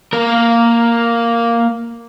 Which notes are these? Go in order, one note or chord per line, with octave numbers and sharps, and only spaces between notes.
A#3 A#4